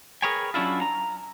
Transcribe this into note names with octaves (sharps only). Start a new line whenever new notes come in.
G#4 A#4 B4 C#5 G5 G#5
F#3 C#4 D4 E4 F4
A#5